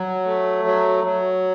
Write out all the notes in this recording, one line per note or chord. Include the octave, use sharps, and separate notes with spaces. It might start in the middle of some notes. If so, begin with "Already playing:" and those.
Already playing: F#3
A3
F#3
F#3